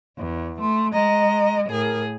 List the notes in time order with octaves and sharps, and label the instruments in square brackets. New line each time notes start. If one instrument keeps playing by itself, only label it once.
[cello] E2
[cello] A3 [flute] C6
[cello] G#3 D#5 [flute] A#5
[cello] A2 G#4 [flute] A#4